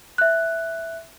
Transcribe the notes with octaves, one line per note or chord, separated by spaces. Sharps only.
E5 F#6